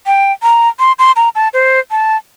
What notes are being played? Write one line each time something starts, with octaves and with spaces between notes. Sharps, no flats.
G5
A#5
C6
C6
A#5
A5
C5
A5